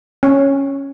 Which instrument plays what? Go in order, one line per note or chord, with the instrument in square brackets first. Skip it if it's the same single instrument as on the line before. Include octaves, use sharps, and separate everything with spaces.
[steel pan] C#4